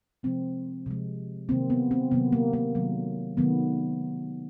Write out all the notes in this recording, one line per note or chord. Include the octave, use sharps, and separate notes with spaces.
C3 F3 G#3 C4
C3 F3 G#3
C3 D#3 F#3 A#3 C4
B3
C4
C3 D#3 F#3 A#3 B3
A#3
A#3
C3 D#3 F#3 A3
C3 D#3 F#3 A3 B3